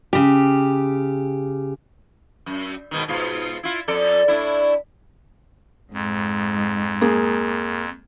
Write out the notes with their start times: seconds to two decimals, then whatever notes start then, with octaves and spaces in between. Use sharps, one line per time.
0.13 C#3 G4
2.46 F#2
2.91 G#2 B2 D#3
3.08 G#2 B2 F4
3.63 E4 F4
3.88 F2 A4 D5
4.28 A2 D4 E4
5.94 F2 G#2
7.01 A#3 G#4